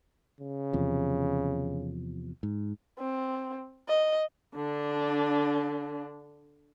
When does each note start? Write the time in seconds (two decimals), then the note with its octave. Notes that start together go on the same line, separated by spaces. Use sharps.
0.41 C#3
0.73 E2 C3 F3
2.43 G#2
2.99 C4
3.89 D#5
4.55 D3 D4